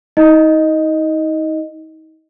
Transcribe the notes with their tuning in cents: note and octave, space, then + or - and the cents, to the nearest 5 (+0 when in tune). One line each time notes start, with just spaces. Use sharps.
D#4 +35 D#5 +0